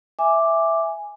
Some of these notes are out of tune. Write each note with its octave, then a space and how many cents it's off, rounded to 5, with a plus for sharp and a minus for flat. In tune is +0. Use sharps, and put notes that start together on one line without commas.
E5 +0 G#5 -10 D6 +0